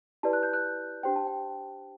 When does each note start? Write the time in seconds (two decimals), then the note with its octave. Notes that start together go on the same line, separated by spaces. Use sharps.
0.23 E4 G4 B4 D5 A5
0.33 F#6
0.43 G6
0.53 F#6
1.03 D4 G4 C5 G5
1.16 A5
1.27 G5